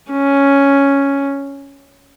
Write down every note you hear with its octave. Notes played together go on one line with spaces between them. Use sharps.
C#4